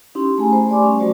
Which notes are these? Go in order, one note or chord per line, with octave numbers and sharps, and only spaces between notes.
C#4 D#4 E4 G4 C6
A3 G#4 G#5 A#5
C5 B5
A3 G4 D5 G#5 C6 D6
G3 C#4 C#6
F#3 A3 F#4 C5 D5